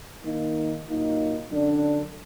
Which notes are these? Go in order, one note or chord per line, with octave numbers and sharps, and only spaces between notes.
D#3 A#3 D#4
A#2 F#3 A#3 D#4
F#2 D3 F#3 D4